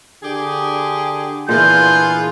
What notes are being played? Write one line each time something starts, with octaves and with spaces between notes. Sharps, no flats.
D3 G4 G#4
A#2 E3 B3 D4 F4 G#4 G6